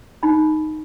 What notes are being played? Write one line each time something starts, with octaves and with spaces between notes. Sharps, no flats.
D#4 B5